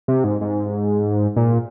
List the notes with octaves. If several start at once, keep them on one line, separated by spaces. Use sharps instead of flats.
C3
G#2
G#2
A#2